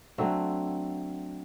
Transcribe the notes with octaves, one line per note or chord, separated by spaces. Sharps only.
D3 F#3 A3 C4